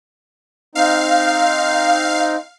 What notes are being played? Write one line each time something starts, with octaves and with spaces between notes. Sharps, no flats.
C4 D#4 F5